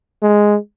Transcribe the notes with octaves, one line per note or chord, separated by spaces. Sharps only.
G#3